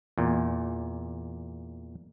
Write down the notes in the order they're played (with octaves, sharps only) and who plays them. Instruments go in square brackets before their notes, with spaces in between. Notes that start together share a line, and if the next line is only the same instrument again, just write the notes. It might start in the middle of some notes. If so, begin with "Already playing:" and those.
[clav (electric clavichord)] E2 A#2